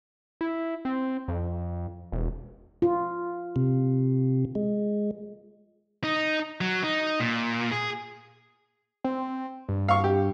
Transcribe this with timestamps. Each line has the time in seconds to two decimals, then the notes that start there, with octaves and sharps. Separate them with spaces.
0.41 E4
0.85 C4
1.28 F2
2.12 E1
2.82 F4
3.56 C3
4.55 G#3
6.04 D#4
6.61 F#3
6.83 D#4
7.20 A#2
7.72 G#4
9.04 C4
9.69 G2
9.88 F5 C#6
10.04 G4